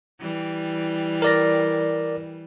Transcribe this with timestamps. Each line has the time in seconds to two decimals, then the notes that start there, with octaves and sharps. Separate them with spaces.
0.19 E3 G3
1.22 A#4 D5 A#6